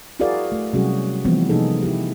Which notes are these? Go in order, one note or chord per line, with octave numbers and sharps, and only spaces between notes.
E4 F#4 G#4 A#4 D5 F5
A3
C3 F#3 G3 C#4 F#4 G#4
E3 F3 G3 A3 B3 C4
C3 F3 A#3 D#4 G#4 A4
E4 G4